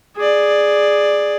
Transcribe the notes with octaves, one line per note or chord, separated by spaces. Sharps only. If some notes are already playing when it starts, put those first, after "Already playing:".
G#4 D5